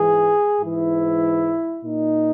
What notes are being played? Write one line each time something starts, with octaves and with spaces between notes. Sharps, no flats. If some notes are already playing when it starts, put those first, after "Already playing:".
Already playing: G#2 E3 G#4
G#2 E3 E4
A#2 D#4